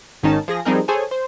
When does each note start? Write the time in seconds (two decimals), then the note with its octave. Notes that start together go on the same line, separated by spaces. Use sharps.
0.23 G#1 D#3 C#4 D#4 A5
0.48 F3 G#4 A#6
0.65 F3 G3 C4 D#4 G#4 A#4
0.88 G#4 A4 C5 C#5 G#5
1.11 C5